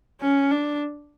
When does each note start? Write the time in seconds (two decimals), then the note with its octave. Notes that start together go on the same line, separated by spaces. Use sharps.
0.21 C#4
0.51 D4